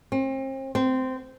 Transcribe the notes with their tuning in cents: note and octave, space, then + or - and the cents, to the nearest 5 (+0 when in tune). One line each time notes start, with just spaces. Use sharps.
C4 +40
C4 -15